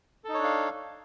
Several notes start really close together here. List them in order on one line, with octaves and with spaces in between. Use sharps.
A4 D#4 C#5 D4 F5